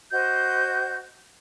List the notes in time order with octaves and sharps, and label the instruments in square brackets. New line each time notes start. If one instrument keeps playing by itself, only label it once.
[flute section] F#4 C5 D#5 G6